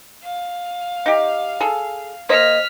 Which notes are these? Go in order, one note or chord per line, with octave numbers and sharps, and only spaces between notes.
F5
D#4 G4
G#4 A4
A#3 C5 D#5 F6 B6